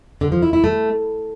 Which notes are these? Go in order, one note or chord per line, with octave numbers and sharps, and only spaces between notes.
D3
F3
E4
E4
A3